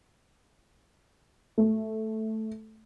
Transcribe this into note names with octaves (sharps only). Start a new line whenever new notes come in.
A3